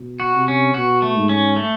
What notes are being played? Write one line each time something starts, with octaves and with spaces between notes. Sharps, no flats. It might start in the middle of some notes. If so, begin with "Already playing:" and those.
Already playing: B2
F#4
C3
C#4
B2 F#4
A3
G#2
C#4
A3